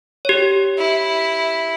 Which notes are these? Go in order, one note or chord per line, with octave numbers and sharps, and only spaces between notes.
G4 C#5
E4